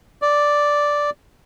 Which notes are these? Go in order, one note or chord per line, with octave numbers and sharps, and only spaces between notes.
D5